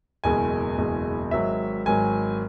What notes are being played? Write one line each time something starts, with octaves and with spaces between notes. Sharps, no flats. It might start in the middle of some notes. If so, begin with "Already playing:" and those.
F#1 E2 B2 G#3 G#5
F#1 E2 B2 G#3
G#1 G#2 F#3 E5
G#1 G#2 F#3 G#5